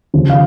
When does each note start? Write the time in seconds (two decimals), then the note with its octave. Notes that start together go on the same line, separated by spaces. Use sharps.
0.14 D#2 C#3 F3
0.30 F5